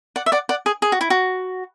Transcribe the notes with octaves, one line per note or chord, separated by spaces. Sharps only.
D5 F#5
E5
D5 F#5
D5 F#5
G#4
G#4
F#4
E4
F#4